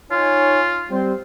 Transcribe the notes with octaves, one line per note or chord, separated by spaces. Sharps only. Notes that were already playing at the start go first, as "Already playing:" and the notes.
D#4 F4 C#5 G#5
G3 C4 C5